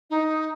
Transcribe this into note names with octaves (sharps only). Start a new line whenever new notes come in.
D#4